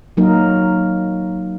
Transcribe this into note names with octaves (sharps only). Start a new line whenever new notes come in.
F#3 A#3 D#4 A#4